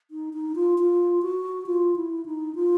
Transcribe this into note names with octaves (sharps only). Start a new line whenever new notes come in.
D#4
D#4
F4
F4
F#4
F4
E4
D#4
F4